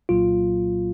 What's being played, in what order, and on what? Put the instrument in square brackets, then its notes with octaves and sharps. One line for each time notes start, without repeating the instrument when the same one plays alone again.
[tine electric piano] C2 A#2 F#3 A#3 F4